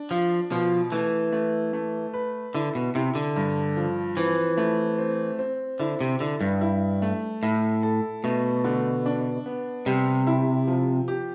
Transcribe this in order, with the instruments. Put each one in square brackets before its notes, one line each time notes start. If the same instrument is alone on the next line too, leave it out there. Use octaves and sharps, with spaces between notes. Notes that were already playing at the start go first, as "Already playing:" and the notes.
Already playing: [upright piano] D4
[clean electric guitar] F3 [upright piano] F4
[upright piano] B2 [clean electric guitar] F3
[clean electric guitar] E3 [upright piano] A3
[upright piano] A3
A3
B4
[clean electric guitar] D3 [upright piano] E4
[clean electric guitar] B2
[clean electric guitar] C3 [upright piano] E4
[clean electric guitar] D3
[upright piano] G2
F3
[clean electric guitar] E3 [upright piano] C4
[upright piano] A3
C4
C4
[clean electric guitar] D3 [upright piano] E4
[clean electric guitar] C3
[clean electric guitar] D3 [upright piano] E4
[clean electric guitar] G2
[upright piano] E4
A3
[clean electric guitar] A2 [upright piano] E4
[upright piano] A4
[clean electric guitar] B2 [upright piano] A3
[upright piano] D3
D4
B3
[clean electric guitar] C3 [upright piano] G3
[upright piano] E4
F3
G4